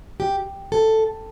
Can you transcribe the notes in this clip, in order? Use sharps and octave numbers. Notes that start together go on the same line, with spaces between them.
G4
A4